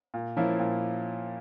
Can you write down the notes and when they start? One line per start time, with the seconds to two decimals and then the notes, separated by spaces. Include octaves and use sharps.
0.14 A#2
0.37 F3 A#3 C#4 E4
0.59 A#2